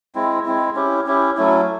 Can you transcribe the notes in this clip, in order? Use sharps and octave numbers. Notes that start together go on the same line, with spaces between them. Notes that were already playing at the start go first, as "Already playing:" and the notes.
G#3 C4 E4
G#3 C4 E4
C#4 E4 G4
C#4 E4 G4
F#3 A3 C#4 E4